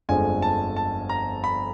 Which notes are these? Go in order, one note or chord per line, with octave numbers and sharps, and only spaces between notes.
G1 F2 D3 F3 G#3 G#5
A5
A5
A#5
B5